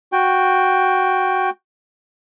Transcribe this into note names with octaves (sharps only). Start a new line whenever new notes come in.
F#4 G5